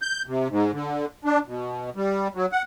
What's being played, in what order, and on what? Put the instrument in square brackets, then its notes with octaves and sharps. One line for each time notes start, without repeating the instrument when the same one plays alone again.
[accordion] G6
C3
G#2
D3
D4
B2
G3
F#3
F#5